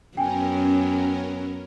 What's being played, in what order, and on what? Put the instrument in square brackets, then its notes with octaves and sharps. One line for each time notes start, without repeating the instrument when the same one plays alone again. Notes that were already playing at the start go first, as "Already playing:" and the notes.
[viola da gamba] F#2 B3 [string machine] C#4 A#4 [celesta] G5 G#5